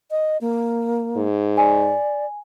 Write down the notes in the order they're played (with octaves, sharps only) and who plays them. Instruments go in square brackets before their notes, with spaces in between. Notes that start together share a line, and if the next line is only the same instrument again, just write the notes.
[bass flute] D#5
A#3
[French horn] G#2
[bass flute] D5 [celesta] G#5